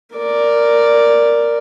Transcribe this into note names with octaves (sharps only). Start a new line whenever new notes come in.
A#4 D5